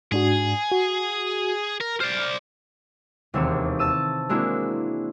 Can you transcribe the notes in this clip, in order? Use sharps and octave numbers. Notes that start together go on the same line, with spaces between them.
G#2 D4 F#4 G#4
F#4
A#4
C5 D5 F6
E1 D#2 C3 C4 D4 C#5
A5 E6 D#7
G#3 A#3 C4 D4 E4 F#4